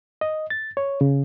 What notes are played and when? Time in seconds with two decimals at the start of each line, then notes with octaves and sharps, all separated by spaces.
0.21 D#5
0.50 A6
0.77 C#5
1.01 C#3